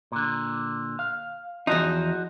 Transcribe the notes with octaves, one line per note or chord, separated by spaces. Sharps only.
A#2 D3
F5
E2 F3 D#4 F#4